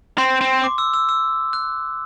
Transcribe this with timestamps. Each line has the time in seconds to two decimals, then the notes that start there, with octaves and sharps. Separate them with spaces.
0.18 C4 C6
0.41 C4
0.64 D6
0.78 E6
0.94 E6
1.09 E6
1.53 F#6